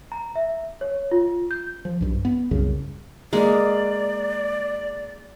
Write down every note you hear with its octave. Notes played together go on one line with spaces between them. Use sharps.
A#5
E5
C#5
F4
G6
F3
B1 G2
B3
C2 F#2 C#3
G#3 A#3 D5